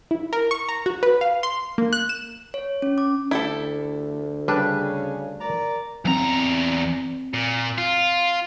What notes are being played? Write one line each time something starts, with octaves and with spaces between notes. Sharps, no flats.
E4
A#4
C#6
A#5
F#4
B4
F5
C6
A#3
F#6
E7
C#5
C#4
D6
D2 E4 G4 A4
C#3 G3 D4 B4
A#4 D5 A#5
E2 F#3 C4 A#5
A#2
F4